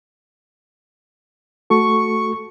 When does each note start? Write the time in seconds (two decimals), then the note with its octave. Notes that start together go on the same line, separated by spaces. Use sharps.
1.70 A3 F#4 A4 C#6